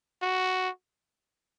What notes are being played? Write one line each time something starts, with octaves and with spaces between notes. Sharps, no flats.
F#4